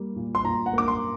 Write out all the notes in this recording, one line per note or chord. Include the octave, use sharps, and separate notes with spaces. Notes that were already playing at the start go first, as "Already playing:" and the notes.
Already playing: G3 A#3
A#2
C6
A#2 A#5
F#5
A#3 D6
C6